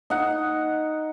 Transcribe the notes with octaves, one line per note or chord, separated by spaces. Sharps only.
D#4 F#5